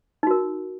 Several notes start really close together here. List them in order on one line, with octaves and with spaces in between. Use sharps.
D#4 F#4 A#4